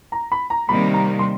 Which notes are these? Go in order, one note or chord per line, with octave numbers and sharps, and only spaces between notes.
A#5
B5
A#5
C3 D#3 G3 A#3 B5
A#5
C6